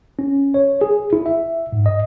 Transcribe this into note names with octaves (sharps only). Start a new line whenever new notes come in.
C#4
C#5
G#4
E4
E5
G#2
D#5